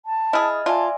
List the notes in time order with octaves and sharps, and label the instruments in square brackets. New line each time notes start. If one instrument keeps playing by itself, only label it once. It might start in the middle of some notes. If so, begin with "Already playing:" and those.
[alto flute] A5
[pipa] E4 G#4 [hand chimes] D#5 F6
[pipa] F4 [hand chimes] D5 E5 G#5 [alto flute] A5